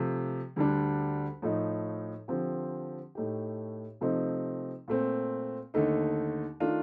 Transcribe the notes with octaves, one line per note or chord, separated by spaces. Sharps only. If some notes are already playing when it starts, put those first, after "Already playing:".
Already playing: C3 F3 A3
D2 D3 G3 D4
A2 F3 A3 D#4
D3 F3 C4 G4
A2 A3 D#4 G4
C3 F3 A3 C4 D#4
A#2 A3 C4
D#2 D3 A3 D#4
D#3 A3 D4 F4